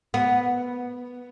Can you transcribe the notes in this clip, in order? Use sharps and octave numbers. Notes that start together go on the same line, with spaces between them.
B3